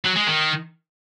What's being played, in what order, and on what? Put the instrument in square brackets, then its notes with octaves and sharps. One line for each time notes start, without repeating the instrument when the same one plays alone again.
[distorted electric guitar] F#3
G#3
D#3